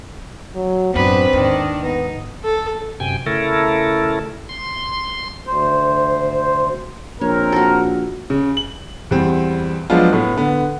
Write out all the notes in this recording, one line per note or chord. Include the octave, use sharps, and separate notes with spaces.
F#3
A1 F#2 B3 C4 D4 B4
D#2 G#2 D#3 D4
B3 D#4
A4
F#2 C3 G5 G#5
C#3 A3 E4 A4 A#4
C6
D2 C5
A#1 C4 A#4 C#5
F#4 A4
C#3
F#7
E2 G3 C4
F3 F#3 G#3 B3 D4 F4
A2 B3
D3 B3